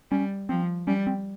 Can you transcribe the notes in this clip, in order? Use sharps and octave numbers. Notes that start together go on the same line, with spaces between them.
G3 C#4
F3 C4
G3 C#4
C4